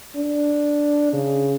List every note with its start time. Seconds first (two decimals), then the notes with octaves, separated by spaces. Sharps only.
0.15 D4
1.13 C#3